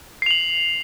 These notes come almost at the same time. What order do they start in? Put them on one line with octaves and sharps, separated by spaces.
C7 F7 F#7